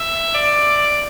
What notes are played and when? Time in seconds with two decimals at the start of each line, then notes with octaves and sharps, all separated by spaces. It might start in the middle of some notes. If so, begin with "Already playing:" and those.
Already playing: E5
0.34 D5